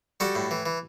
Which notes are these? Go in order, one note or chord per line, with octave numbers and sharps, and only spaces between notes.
G3 F#4 A4
A2
E3
E3